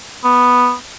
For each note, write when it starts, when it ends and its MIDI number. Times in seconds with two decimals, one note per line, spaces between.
0.24 0.73 59